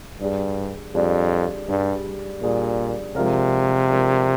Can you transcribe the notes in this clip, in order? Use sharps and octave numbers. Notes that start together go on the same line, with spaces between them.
G2 G3 D4 G#4 D5
F2 G3 D4 G#4 D5
G2 G3 D4 G#4 D5
A#2 G3 D4 G#4 D5
C3 F3 G#3 D4 F4 A#4
F3 G#3 D4 F4 A#4